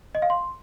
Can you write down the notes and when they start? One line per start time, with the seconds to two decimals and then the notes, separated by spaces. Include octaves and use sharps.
0.15 D#5
0.22 F5
0.30 C6